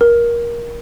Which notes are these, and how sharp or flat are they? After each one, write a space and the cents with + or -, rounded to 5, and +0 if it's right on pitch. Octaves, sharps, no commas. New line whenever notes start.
A#4 +20